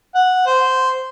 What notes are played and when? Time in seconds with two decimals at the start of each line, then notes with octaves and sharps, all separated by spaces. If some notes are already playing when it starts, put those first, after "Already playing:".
0.15 F#5
0.46 C5